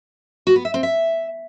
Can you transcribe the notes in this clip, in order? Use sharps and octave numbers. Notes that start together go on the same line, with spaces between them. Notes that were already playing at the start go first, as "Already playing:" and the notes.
F#4
B3
E5
C4
E5